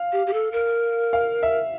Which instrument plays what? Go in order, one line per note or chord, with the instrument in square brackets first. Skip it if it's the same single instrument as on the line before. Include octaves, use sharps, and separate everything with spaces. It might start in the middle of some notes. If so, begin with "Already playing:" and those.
Already playing: [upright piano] F5
[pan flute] G4
G4
A4
A#4
[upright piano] F5
E5